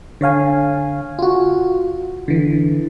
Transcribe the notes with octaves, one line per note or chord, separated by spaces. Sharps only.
D3 C#5 F5 G#5
F4 F#4
D3 E3